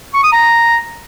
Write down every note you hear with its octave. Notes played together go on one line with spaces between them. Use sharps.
C#6
D#6
A#5